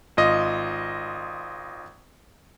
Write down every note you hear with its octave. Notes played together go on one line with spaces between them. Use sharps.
G#1 F4 D#5